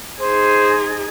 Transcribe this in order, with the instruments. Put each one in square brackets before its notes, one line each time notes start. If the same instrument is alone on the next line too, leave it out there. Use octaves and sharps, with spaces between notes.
[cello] D#4 G#4 [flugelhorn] C5